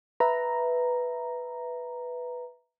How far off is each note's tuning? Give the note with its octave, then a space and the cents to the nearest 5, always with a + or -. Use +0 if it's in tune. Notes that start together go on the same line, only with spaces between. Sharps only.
B4 +0 E5 +0 A#5 +0